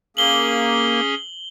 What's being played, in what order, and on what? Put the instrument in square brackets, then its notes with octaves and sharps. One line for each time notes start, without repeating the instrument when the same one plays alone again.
[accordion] A#3 [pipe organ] C#4 G#4 [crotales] F#7 G7